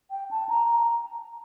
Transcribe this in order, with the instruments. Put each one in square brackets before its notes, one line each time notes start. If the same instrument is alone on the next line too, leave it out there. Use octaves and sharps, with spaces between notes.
[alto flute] G5
A5
A#5
A#5